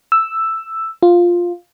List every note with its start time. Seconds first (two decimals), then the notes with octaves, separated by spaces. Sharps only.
0.12 E6
1.03 F4